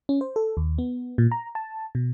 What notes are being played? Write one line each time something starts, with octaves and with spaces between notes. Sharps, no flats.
C#4
C5
A4
D#2
B3
A#2
A#5
A5
B2